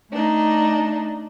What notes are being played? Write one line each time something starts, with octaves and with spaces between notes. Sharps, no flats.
A3 D4 D#4